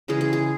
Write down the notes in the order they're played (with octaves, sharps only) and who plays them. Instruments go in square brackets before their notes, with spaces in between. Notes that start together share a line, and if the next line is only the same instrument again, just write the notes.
[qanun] C#3 E3 G#3 G#4
G#4
G#4